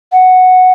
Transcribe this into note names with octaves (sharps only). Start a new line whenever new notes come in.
F#5